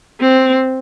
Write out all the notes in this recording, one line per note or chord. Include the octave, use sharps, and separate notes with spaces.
C4